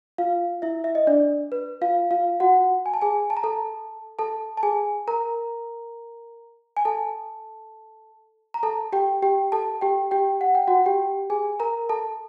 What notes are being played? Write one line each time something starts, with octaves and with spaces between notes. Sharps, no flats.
F4 F5
E4 E5
E5
D#5
D4 D5
B4
F4 F5
F4 F5
F#4 F#5
G#5
A5
G#4 G#5
A5
A#5
A4 A5
A4 A5
A5
G#4 G#5
A#4 A#5
G#5
A4 A5
A#5
A4 A5
G4 G5
G4 G5
A4 A5
G4 G5
G4 G5
F#5
G5
F#4 F#5
G4 G5
G#4 G#5
A#4 A#5
A4 A5